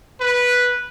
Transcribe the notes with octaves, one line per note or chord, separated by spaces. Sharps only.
B4